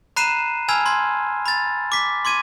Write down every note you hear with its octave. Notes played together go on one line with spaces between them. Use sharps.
A#5 B5 F#6 C7 D#7 E7
G#5 A5 B5 E6 F6 G#6
B5 C6 G#6
B5 A6
D6 B6
C6 D6 G#6 D#7